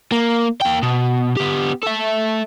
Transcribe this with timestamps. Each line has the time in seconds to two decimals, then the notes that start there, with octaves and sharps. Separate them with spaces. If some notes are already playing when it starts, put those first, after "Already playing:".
0.12 A#3
0.61 A#3 G5
0.83 B2
1.37 B3 G4
1.83 A4 E5